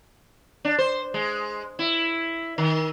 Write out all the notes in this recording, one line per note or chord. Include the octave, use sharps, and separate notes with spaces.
D4
C5
G#3
E4
D#3